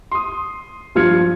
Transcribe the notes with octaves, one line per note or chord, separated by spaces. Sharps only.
C6 D#6
G2 F3 F4 F6 G#6 C#7